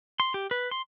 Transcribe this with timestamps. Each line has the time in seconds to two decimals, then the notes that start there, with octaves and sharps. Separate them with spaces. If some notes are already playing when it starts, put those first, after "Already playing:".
0.20 C6
0.34 G4
0.51 B4
0.71 C6